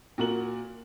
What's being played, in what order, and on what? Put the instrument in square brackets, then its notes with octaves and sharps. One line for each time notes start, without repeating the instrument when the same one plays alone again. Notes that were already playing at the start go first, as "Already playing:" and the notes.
[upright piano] A#2 F#4 A#4 F#7